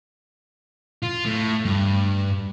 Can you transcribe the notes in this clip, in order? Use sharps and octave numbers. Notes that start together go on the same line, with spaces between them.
F4
A2
G2